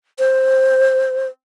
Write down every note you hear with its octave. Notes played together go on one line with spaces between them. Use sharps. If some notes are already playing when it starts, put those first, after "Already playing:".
C5